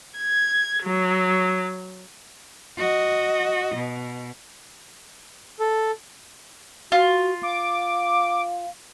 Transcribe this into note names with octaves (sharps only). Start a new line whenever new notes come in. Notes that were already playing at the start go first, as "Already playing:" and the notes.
G#6
F#3
F#4 D#5
B2
A4
F4 F#4
F5 D6